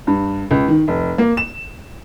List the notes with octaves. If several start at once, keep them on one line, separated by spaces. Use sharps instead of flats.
G2
C#2
D#3
F1
A#3
E7